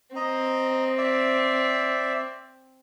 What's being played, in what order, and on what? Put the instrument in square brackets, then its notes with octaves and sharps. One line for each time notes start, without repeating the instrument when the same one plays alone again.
[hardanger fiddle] C4 [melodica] D#5 A#5
[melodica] D5 E5